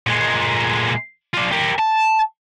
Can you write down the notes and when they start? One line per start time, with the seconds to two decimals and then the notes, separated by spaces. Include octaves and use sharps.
0.07 A#2 G#3
1.34 D4 F4
1.52 G4 A#4
1.79 A5